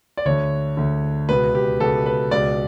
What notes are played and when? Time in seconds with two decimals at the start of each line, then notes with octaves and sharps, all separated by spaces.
0.17 D5
0.25 D2 D3 C#5
0.77 D2 D3
1.29 C#2 B2 B4
1.55 G4
1.80 C#2 B2 A4
2.06 B4
2.31 C#2 B2 D5